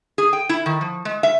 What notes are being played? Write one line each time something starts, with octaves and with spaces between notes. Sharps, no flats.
G#4
G5
E4
D#3
F3
G#3
E5